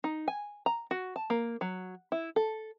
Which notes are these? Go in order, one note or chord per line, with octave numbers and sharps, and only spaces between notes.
D#4
G#5
A#5
F#4
A5
A#3
F#3
E4
A4